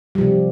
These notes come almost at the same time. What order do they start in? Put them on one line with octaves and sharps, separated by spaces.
G3 F3 C3